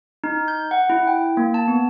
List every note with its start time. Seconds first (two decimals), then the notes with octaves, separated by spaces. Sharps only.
0.24 D#4
0.48 G6
0.71 F#5
0.90 E4
1.07 G5
1.37 A#3
1.54 A5
1.68 B3